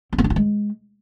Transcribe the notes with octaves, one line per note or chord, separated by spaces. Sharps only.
C4
B3
D4
F4
G#3